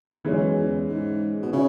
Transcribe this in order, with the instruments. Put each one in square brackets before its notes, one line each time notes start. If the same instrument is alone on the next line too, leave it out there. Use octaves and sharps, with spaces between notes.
[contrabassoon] F#2 [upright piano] E3 G#3 C#4
[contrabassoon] E2
G#2
B2
[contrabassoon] C#3 [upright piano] C#4 E4